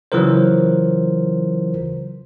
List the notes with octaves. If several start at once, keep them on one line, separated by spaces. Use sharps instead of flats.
C#3 E3 F#3 F4 A#4 C5